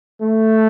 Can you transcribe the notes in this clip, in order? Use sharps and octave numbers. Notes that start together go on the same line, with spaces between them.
A3